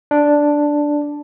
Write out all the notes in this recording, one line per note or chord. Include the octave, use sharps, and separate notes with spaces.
D4